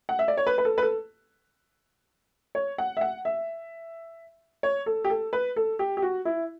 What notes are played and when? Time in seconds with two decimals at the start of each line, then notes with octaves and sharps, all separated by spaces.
0.09 F#5
0.19 E5
0.28 D5
0.38 C#5
0.47 B4
0.58 B4
0.65 A4
0.78 B4
0.82 A4
2.55 C#5
2.78 F#5
2.97 E5
3.01 F#5
3.25 E5
4.63 C#5
4.86 A4
5.05 G4
5.10 A4
5.33 B4
5.56 A4
5.79 G4
5.97 G4
6.02 F#4
6.25 E4